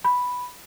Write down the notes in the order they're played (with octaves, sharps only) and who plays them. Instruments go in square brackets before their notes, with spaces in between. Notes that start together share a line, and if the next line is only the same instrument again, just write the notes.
[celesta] B5